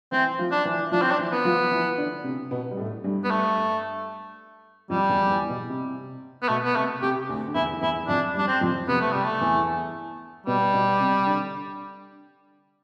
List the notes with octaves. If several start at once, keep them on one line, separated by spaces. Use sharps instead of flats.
E3 C4 E4
F3 F4
D4
E3 E4
E4
F3 D4 F4
C4
D4
E3 E4
B3
F3 F4
E3 E4
D3 D4
C3 C4
B2 B3
G3
A2 A3
G2 G3
B3
A3
F2 F3 G3
E2 E3
E2 E3
B2
C3
B3
B2 A3
B3
C3 A3
C3 G4
D2 D3
D3
E2 E3 E4
E2 E3 E4
F2 F3 D4
G2 G3
D4
C4
F2 F3
C3 B3
A3
C3 G3
A3
E2 E3
B2 G3 B3
B2 B3
C3 C4
D3 D4